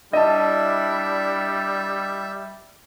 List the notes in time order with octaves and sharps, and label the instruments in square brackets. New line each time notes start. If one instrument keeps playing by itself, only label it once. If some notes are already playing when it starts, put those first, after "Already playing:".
[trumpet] G3 [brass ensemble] D4 E4 [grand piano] D#5 A5 [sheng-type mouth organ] E5